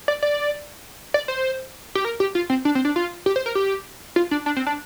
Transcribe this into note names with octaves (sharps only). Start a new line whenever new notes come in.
D5
D5
D5
C5
G4
A#4
G4
F4
C4
D4
C4
D4
F4
G4
C5
A#4
G4
F4
D4
D4
C4
D4